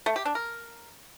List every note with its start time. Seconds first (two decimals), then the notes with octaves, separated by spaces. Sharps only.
0.06 A3
0.16 G4
0.25 D4
0.35 A#4